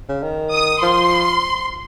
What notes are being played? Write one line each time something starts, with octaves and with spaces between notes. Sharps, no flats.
C#3
D#3
D#6
F3 C6